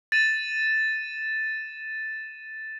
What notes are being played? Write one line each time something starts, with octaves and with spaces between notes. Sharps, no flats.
A6 D#7 E7